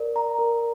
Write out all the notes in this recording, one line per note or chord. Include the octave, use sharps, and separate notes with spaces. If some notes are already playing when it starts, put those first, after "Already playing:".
Already playing: A#4 D5
A#5
A#4